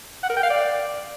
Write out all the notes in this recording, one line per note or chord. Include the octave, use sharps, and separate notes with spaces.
F#5
A#4
G5
F5
D5